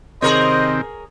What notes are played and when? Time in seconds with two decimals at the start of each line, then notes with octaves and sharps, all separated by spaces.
0.22 C3 D#3 C4 G#4 A#4 C5 C#5 D#5